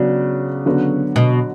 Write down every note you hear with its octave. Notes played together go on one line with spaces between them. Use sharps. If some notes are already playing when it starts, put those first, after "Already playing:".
Already playing: C#3 F#3 B3 D4
D3 F#3 B3 F#4
B2